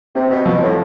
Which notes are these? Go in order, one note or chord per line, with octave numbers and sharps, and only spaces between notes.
C3 C4
B2
B2 F3
A2